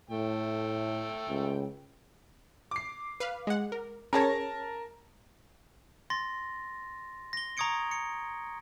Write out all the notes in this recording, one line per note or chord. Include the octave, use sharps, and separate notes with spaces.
A2 A3 G5
C#2
D6 C7
B4 F5
G#3 F#5
A#4
C#4 G#4 A#4 C#5 A5 A#6
C6 A6 A#6
A#6 G7
A#5 C#6 D#6 G#6 C#7 D7
C#7